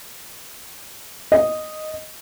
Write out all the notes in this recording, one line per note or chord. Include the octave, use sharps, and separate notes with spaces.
D#5